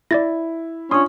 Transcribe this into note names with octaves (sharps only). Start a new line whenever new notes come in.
E4 D5 A6 A#6
C#4 D4 F4 C6 D#6